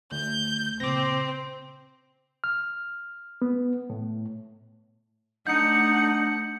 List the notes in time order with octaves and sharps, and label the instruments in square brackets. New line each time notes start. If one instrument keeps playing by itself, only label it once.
[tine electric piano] D2 [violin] G6
[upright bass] A#2 C#3 [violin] C4 [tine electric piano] D6 A#6
[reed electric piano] F6
B3
A2
[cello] A3 F#5 [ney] D4 [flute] D#4 [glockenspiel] G6 C#7